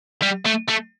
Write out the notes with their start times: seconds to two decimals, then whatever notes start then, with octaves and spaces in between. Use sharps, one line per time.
0.23 G3
0.45 A3
0.68 A3